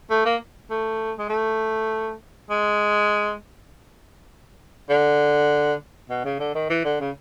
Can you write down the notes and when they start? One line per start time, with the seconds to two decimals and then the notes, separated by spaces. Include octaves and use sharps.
0.10 A3
0.25 A#3
0.70 A3
1.19 G#3
1.30 A3
2.50 G#3
4.89 D3
6.10 B2
6.25 C#3
6.39 D3
6.55 D#3
6.69 E3
6.85 D3
7.00 C#3